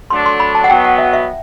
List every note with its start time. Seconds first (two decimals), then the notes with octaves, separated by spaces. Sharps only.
0.10 D3 F#3 A3 D4 C6
0.26 C6
0.40 B5
0.55 A5
0.64 F#5
0.69 B2 F#3 B3 F#4 G5
0.85 F#5
0.98 E5
1.13 E5